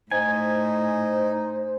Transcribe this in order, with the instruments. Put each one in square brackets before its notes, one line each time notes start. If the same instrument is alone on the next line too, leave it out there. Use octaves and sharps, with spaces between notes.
[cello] A2 [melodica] D#4 [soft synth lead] C5 [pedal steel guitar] G#5